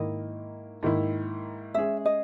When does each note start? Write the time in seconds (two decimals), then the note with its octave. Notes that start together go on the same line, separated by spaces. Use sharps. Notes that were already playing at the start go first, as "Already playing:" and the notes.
Already playing: G#2 D#3 A#3 E4 D#5
0.83 G#2 D#3 A#3 E4
1.74 G#3 C#4 G#4 E5
2.05 D#5